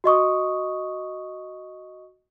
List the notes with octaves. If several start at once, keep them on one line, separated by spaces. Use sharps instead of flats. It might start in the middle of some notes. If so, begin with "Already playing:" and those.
F#4 D#5 C#6 D#6